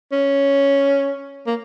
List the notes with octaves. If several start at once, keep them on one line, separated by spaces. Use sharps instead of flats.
C#4
A#3